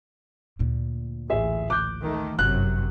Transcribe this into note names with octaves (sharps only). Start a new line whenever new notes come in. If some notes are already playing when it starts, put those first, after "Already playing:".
D2 A#2
A1 G#4 E5
D6 F#6 G6
D#3 A3
G1 F#2 C3 F#3 F#6